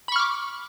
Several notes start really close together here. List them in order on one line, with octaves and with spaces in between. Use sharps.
B5 C#6 F6 D6